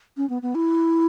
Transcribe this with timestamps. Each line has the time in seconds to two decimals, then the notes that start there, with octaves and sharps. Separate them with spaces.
0.17 C#4
0.30 B3
0.42 B3
0.55 E4